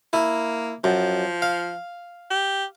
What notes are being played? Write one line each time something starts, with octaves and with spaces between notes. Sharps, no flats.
A#3 E4
F#2 F3
F5
G4